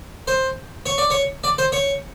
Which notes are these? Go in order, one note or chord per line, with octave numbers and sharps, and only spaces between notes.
C5
C#5
D5
C#5
D5
C5
C#5